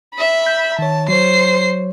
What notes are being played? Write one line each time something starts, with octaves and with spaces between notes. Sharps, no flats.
E5 B5
G6
D#3 C#5 A5
F#3 C5 C#5 C7